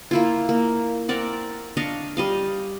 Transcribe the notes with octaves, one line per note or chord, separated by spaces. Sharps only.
A#3 E4 F4
A#3
C4 A#4 D5 F#5
D4 D#5 F5 C#6
G3 D#5 F5